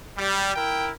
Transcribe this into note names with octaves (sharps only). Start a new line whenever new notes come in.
G3
E4 A#4 G5